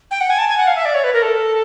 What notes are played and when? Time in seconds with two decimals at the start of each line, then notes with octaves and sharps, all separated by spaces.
0.11 G5
0.21 F#5
0.30 G#5
0.38 A5
0.49 G#5
0.58 F#5
0.67 F5
0.76 E5
0.85 D5
0.95 C#5
1.04 B4
1.13 A#4
1.22 A4